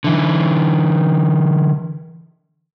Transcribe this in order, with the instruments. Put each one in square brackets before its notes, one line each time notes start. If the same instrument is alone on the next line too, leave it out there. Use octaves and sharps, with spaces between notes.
[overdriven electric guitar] D3 E3